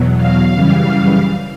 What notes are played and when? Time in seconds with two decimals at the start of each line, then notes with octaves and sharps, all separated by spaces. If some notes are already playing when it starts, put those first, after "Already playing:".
Already playing: E2 B2 F#3
0.17 F5
0.54 F#2 C#3 E3 G3